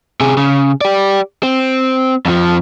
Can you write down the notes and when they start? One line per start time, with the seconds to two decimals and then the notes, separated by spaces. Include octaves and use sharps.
0.20 C3 G#4
0.37 C#3
0.81 G4 D5
1.43 C4
2.25 F2 F3